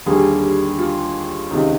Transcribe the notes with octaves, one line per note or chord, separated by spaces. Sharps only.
D#2 D3 G3 A#3 G#4
F4
C#2 C3 D#3 D#4